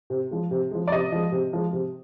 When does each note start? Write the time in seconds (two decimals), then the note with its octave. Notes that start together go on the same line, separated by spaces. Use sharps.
0.10 C3
0.31 F3 G#3
0.51 C3
0.71 F3 G#3
0.87 D5
0.92 C3 D#5
1.12 F3 G#3
1.32 C3
1.53 F3 G#3
1.73 C3